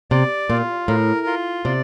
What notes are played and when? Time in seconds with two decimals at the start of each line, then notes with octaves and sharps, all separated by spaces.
0.11 C3 D5
0.49 A#2 F4
0.88 A2 A#4
1.27 F4
1.65 C3 D5